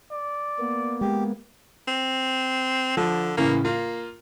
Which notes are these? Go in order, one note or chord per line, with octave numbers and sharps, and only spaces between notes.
D5
A#3 B3
G#3 G4
C4
D3 F3
A2 C#3 E3 A#3
A#3 F4